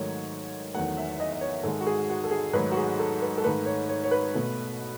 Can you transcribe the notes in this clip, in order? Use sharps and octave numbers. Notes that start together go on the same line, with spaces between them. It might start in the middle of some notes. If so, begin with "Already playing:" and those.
Already playing: G#2 D#3 F#3 A3 C#5
E2 D#3 F#3 A3 F#5
E5
D#5
D#5
C#5
G#2 D#3 G#3 A4
F#4
G#4
F#4
A4
G#4
G#2 D#3 F#3 A3 B4
F#4
G#4
A4
B4
A4
G#2 D#3 A3 B4
C#5
C#5
C#5
B4
B2 A3